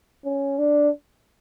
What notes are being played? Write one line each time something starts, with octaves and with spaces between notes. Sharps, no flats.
C#4
D4